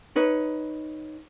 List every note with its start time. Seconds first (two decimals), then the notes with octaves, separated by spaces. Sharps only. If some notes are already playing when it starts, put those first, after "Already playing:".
0.16 D#4 B4 C#5